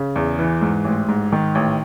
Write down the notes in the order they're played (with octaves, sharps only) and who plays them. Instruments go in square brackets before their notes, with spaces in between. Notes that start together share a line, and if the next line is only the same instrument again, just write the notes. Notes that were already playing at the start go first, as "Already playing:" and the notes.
Already playing: [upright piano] C#3
E2
E3
G#2
A1
G#2
D#3
A1